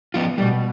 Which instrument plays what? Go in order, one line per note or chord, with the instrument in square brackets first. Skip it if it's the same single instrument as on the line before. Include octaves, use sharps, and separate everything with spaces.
[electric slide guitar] F3 B3 F4
[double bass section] B2 [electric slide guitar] G3